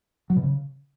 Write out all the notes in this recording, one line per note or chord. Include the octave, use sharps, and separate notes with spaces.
F#3
B2
C#3